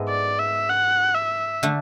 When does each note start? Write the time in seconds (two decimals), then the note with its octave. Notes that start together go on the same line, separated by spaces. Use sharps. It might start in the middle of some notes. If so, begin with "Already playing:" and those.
Already playing: G#2 G#3 B3 E4 A4
0.09 D5
0.39 E5
0.69 F#5
1.15 E5
1.63 D3 A3